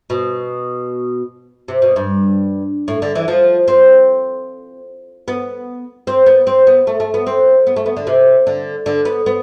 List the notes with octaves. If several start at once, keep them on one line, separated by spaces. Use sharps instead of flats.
B2
C3
B2
G2
A2
D3
E3
F3
C4
B3
C4
B3
C4
B3
A3
A3
B3
C4
B3
A3
B3
D3
C3
D3
D3
B3
B3